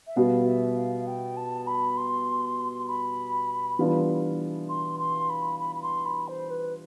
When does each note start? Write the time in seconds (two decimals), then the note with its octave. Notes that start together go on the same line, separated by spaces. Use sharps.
0.07 E5
0.16 B2 G3 B3 F5
0.46 E5
0.77 F5
1.07 G5
1.37 A5
1.67 B5
1.97 C6
2.88 B5
3.79 E3 G3 B3 D4 F4
4.69 C6
5.00 C6
5.30 B5
5.60 B5
5.76 B5
5.83 C6
6.05 B5
6.28 C5
6.50 B4